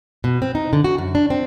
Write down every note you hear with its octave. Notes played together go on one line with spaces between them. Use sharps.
B2
C4
D#4
D3
F#4
F#2
D4
C4